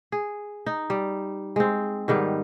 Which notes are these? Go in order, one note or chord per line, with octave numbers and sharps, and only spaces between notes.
G#4
D#4
G3
G#3 C4
G#2 D#3 G3 B3